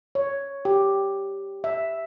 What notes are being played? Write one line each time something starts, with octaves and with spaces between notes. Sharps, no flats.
C#5
G4
E5